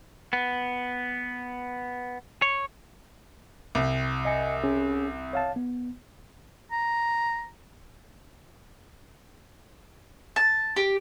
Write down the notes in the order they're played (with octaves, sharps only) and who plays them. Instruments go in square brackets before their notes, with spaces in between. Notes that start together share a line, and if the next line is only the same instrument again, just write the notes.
[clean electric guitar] B3
C#5
[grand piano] C2
[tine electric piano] D#5 G#5 C#7
C#4 G#4
C#5 F5 A5
B3
[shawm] A#5
[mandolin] A5
G4